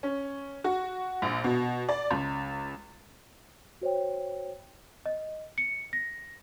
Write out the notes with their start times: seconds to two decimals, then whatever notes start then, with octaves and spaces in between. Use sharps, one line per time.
0.03 C#4
0.64 F#4
1.22 A#1
1.44 B2
1.89 D5
2.11 C#2
3.81 F#4 C5 C#5 G5
5.06 D#5
5.58 C#7
5.93 A#6